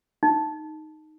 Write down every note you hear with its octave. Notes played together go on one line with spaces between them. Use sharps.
D#4